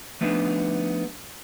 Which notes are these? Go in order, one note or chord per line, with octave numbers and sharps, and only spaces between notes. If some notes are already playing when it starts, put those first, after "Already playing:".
F3 A3 B3 D4 D#4